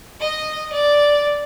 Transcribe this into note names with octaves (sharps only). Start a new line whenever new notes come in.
D#5
D5